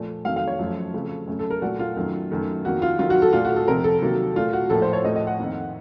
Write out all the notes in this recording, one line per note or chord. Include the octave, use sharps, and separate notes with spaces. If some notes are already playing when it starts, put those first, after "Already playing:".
Already playing: A#2 F3 A3
F2 D#3 F#3 A3 F5
F5
C#5
F#2 F3 A3
F2 C#3 F3 A3
F#2 C#3 A3
A4
A#4
A#2 F#3 A3 F#4
F4
F#2 D#3 A3
F#2 D#3 A3
F2 D#3 A#3 F#4
F4
F2 D#3 F#3 F4
F#4
A4
A#2 A3 F4
F#4
A4
F2 C3 F3 A#4
A4
C3 D#3 F#3 A#3
A#2 A3 F4
F#4
A2 F3 A#3 A4
C5
C#5
A2 F3 A3 D#5
D#5
F#5
F2 D#3 A#3